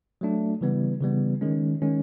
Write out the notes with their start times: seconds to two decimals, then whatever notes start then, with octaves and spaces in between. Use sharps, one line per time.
0.21 F#3 A3 D4
0.61 C#3 E3 G3 B3
1.01 C#3 E3 G3 B3
1.41 D#3 G#3 C#4
1.82 D#3 G#3 C#4